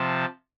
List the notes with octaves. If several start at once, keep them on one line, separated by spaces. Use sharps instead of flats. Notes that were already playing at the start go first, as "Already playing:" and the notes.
Already playing: C3 F3 A5